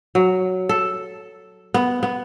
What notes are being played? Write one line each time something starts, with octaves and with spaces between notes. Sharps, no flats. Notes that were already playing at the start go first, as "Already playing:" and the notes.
F#3
A4
B3
B3